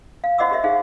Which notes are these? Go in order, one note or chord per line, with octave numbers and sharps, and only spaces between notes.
F5
F#4 C5 D#5 F#5 D6 E6
G4 A#4 D#5 E5
D#4 G#4 C5 F5 D6